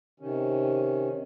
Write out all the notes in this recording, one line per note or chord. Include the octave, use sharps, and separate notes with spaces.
C3 D#3 C#4